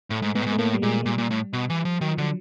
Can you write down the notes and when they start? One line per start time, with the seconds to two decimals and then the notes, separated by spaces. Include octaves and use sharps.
0.10 A2 A3
0.22 G#2
0.35 G#2 B3
0.42 A2
0.46 G#2
0.52 A3
0.58 A2 A#3
0.74 G3
0.82 A#2 G#3
1.01 G#3
1.06 A#2 G3
1.18 A#2
1.31 A2
1.53 B2
1.70 E3
1.85 F3
2.01 D#3 F#3
2.11 F3
2.18 D3 F#3